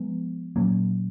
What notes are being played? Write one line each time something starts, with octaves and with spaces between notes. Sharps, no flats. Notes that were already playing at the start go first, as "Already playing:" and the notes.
Already playing: F3 G#3 B3
A#2 F#3 A#3 C#4